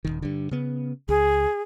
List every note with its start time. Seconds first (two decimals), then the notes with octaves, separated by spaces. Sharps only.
0.05 D#1 B1 D#3
0.22 G2 D3
0.51 C#3 B3
1.09 C#2 G#4